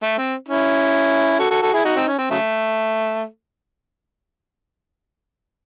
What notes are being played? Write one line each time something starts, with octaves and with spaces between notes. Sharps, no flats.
A3
C4
C#4 E4
F#4 A4
F#4 A4
F#4 A4
E4 G#4
D#4 F#4
C4 D#4
C#4
C4
C#3 F#3 A3